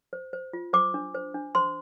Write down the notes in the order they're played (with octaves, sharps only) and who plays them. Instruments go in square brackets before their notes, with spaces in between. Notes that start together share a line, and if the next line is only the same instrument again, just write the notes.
[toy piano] C5
C5
F4
C5 D6
D4
C5
D4
C5 C6